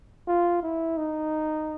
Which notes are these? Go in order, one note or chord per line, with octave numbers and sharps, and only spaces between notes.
F4
E4
D#4